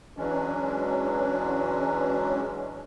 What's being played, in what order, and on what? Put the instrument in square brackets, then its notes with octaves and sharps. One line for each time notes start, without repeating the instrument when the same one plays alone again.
[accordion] E3 F#3 G#3 C#4 D4